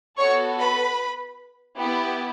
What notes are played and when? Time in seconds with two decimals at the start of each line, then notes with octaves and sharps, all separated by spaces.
0.19 B3 F#4 A4 C#5 C#6
0.59 B4 B5
1.78 B3 E4 G4